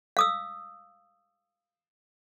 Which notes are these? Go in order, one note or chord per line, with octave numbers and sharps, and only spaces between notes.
F5 D#6 E6